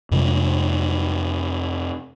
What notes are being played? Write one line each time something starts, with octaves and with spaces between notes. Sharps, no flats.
F2 C3 G#3